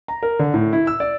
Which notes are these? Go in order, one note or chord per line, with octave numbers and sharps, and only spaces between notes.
A#5
A#4
D3
A2
E4
E6
D5